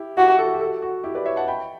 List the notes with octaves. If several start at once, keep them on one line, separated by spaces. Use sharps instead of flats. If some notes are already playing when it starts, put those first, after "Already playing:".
Already playing: E4 G4
E4 F#4 G4
F#4 A4
G4
F#4 A4
F#4
E4 G4
B4 D5
C#5 E5
F#5 A5
G5 B5